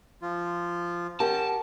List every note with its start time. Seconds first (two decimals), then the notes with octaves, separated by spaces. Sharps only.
0.22 F3 F4
1.20 C#4 G4 A#4 F#5 A5